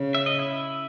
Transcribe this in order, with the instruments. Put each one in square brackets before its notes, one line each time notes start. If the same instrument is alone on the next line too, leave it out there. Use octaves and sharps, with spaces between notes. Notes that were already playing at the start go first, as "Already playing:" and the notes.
Already playing: [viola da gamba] C#3
[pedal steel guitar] E5
D#5
E4 E5